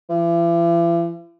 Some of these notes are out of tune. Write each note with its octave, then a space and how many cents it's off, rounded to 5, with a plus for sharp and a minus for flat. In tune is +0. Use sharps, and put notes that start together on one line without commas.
E3 +45